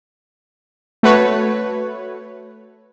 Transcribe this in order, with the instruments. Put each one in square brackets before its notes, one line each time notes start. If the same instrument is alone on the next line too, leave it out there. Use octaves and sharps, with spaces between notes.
[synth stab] A3 F#4 B4 C#5